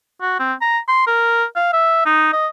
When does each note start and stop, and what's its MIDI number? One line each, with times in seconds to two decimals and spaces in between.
0.21 0.38 66
0.40 0.54 60
0.61 0.78 82
0.88 1.04 84
1.07 1.44 70
1.56 1.71 77
1.73 2.03 76
2.06 2.31 63
2.33 2.47 75